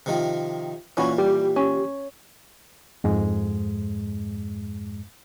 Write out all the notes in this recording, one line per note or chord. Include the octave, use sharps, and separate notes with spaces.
C3 D#3 F3
A#2 E3 C#4 F#4 B5
G3 G4
C#4
F2 G#2 G#3